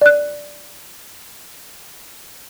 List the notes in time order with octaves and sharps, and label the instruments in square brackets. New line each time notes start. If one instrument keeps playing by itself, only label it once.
[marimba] D5 F#6